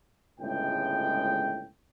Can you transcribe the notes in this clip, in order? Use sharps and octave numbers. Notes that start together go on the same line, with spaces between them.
G1 C#2 A2 G#3 G5